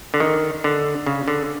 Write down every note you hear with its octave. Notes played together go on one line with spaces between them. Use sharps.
D3
D#3
D3
C#3
D3